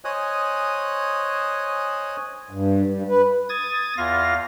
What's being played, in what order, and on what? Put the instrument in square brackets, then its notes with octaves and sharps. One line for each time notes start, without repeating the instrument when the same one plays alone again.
[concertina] C5 C#5 D#5 G#5 D#6 F#6
[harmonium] G2
G2
B4
[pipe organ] D#6 G#6 A6
E2 F4 F5 A#6